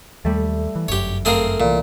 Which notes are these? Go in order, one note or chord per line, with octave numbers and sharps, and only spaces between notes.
D#2 G3 A3
E3
G1 F#2 G4 C#5
A3 C4 G#4 A#4 F5
C2 A#2 E3